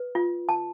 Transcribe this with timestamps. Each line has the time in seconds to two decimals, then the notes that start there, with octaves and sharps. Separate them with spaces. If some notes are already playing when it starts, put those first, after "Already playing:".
Already playing: B4
0.15 F4
0.49 A5